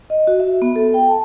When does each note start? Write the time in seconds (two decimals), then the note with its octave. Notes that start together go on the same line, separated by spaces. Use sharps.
0.10 D#5
0.27 F#4
0.40 E5
0.62 B3
0.76 A4
0.94 G5
1.08 A5